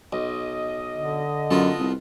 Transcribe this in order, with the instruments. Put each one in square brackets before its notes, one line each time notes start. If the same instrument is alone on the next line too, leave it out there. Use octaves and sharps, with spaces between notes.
[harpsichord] B1 [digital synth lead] D#5
[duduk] D3
[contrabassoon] F#2 [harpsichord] B3 F4 A4
[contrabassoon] C2